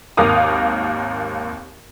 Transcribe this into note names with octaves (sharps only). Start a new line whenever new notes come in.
G#1 D#2 A#4 F5 D6 D#6